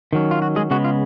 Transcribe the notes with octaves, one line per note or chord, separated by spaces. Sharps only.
D#3 F#3 C#4
F4
F#4
G#3 G#4
C#3 G#3 B3 F#4
F4